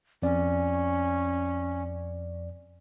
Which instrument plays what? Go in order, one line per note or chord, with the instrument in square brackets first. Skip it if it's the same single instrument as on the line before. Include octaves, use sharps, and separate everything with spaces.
[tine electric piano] F2 D5 [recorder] C#4